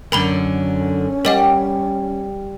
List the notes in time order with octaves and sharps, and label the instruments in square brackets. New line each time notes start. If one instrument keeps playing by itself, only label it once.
[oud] F#2 D3 [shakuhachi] C#4 [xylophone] A#4 B5 G7
[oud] G3 G4 [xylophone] A#4 D#5 F#5